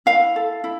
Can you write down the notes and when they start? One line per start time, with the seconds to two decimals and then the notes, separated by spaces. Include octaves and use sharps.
0.06 E4 F5
0.36 A4
0.64 E4